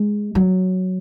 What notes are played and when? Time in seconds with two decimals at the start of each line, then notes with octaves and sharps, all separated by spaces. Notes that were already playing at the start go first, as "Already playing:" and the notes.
Already playing: G#3
0.35 F#3